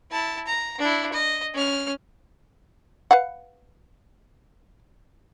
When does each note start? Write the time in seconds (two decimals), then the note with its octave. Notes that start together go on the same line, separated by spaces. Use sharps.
0.11 E4 A5
0.47 A#5
0.79 D4 E4
1.13 D#5
1.55 C#4 F6
3.11 B4 F5 F#5